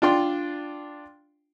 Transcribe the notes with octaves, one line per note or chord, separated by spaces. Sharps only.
D4 F4 G5 C6